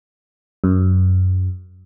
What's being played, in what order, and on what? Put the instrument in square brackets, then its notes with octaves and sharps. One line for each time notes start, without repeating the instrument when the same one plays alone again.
[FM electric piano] F#2